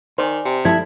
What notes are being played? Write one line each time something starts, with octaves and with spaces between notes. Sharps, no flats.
D#3 C5 D5 G#5
C3
F3 G3 A3 E4 A5 G#6